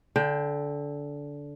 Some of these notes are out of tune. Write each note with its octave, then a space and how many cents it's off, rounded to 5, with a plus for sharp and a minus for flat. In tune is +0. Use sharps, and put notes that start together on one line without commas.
D3 -20 G5 +15